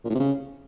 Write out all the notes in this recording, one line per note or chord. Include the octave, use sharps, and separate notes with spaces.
A#2
A2
C3
C#3